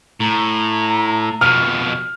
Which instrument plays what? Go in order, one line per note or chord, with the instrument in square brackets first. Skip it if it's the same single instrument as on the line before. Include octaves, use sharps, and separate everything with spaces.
[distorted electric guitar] A2 [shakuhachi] A#5
[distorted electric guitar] F2 B2 [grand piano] F6